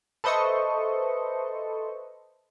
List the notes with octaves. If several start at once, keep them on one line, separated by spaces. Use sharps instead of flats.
A4 B4 C5 D#5 E5 C#6